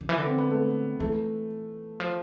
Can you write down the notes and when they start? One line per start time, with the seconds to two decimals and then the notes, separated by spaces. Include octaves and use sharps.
0.01 D3
0.09 E3
0.18 D3
0.26 C4
0.38 B3
0.50 A3
1.00 E3 A3
2.00 F3